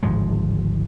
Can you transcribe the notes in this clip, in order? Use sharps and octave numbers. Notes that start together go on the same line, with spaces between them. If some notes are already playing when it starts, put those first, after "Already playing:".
D1 G#1 F3 G#3